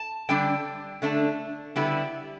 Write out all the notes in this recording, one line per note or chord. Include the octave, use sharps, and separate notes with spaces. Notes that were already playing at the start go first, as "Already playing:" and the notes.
Already playing: A5
D3 G3 D4 G5
D3 A3 D4
D3 G3 B3 E4